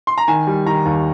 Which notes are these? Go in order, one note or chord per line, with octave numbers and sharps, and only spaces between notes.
C6
A#5
D#3 G#5
G3
D#3 A#5
D#2